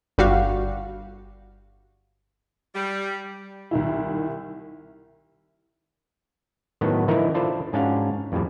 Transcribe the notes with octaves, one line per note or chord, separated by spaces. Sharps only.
G1 G3 F#4 F5
G3
C2 D#3 E4
A2 D#3 F#3 B3
D3 E3 F3 D#4 E4 A#4
D4 E4 F4 A4 C5 D5
G#2 C#4 D4 F#4 F5
F2 A2 G3